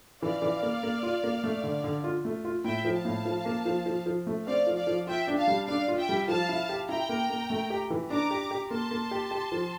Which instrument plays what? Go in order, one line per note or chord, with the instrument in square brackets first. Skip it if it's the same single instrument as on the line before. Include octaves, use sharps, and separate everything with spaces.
[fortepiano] E3 [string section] D5 F5
[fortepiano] E3
A#3
A#3
F4
A#3
A3
D3
D3
F4
A3
F4
[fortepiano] A2 [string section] E5 G5
[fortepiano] F3
[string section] F5 A5
[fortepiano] A2
F3
A#3
F3
F3
F3
A3
[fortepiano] C4 [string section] D5 F5
[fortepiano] F3
[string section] D5 F5
[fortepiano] F3
[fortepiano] F4 [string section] E5 G5
[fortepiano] D4
[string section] F5 A5
[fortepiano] G3
[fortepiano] D4 [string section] D5 F5
[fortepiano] F4
[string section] E5 G5
[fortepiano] G3
[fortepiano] F3 [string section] F5 A5
[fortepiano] E4
G4
[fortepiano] E4 [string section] G5 A#5
[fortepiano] A#3
A#3
A3
G4
E3
[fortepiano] D4 [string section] A#5 D6
[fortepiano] G4
G4
[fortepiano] A#3 [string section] A5 C6
[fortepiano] A#3
G4
G4
F3